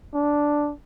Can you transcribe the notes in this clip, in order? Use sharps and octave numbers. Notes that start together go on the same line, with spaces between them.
D4